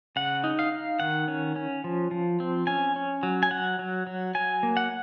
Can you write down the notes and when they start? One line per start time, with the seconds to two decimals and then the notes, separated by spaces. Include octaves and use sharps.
0.16 C#3 F#5
0.44 D#4
0.59 F5
0.72 D#4
1.00 D#3 F#5
1.28 C#4
1.56 C#4
1.84 F3
2.11 F3
2.40 C4
2.67 C#4 G#5
2.96 C#4
3.23 F#3
3.43 G#5
3.51 F#3 F#5
3.79 F#3
4.07 F#3
4.35 F#3 G#5
4.63 A#3
4.77 F#5